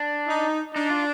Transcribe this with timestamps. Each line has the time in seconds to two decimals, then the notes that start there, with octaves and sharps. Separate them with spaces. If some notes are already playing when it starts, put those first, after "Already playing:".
Already playing: D4
0.27 D#4
0.75 D4 D#4
0.90 F4